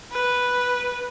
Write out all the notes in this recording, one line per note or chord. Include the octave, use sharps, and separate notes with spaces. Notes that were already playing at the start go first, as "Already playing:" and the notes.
B4